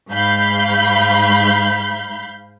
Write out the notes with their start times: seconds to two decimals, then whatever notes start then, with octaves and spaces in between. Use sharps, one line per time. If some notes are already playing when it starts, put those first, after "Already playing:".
0.11 G#2 F5 B5 G6